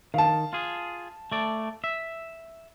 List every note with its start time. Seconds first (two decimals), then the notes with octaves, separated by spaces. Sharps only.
0.14 D#3 F5 A5
0.53 F4 G#4
1.32 A3 D5
1.84 E5